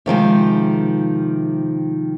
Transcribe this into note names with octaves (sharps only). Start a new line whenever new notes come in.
C3 D#3 F3 G#3